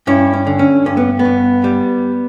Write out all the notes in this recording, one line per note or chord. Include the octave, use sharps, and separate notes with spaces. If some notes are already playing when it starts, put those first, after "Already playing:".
G2 C#4 E4
C#4
D3
C#4
G2 C#4
B3
B3
G2
G3